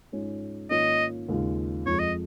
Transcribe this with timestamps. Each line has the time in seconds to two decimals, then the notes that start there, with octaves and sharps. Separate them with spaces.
0.12 G#2 G#3 C#4 F4
0.70 G#2 D#3 A#3 C#4 F4 D#5
1.29 D#2 C#3 G#3 F4
1.86 F2 F3 G#3 F4 C#5
2.00 D#5